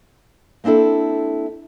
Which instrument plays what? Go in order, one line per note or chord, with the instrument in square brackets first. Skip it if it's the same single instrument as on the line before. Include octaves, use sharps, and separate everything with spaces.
[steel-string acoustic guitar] A#3 C4 D4 E4 A4